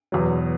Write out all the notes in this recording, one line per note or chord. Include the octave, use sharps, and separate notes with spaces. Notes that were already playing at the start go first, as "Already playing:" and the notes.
E2 B2 F#3